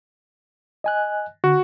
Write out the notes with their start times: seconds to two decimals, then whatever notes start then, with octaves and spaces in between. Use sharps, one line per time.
0.84 D#5 G#5 F#6
1.44 D3 F#4